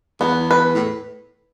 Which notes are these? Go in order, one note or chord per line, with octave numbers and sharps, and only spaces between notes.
E2 B3
B4
A2